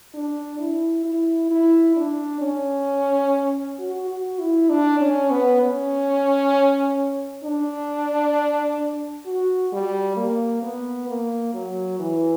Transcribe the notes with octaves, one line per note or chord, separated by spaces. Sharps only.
D4
E4
E4
E4
D4
C#4
F#4
F#4
E4
D4
C#4
B3
C#4
D4
F#4
G3
A#3
B3
A#3
F#3
E3